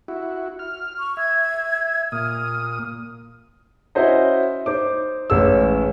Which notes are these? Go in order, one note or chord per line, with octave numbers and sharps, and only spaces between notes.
E4 F#4
F6
C#6
E5 G#6
A#2 D#6 F6
C#4 E4 F#4 C5 D#5
D#4 C5 D6
A1 G#3 C#4 E6